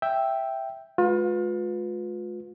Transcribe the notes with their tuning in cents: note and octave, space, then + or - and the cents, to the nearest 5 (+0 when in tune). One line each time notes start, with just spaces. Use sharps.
E5 +0 G5 +0
G#3 +35 F4 +35 B4 +0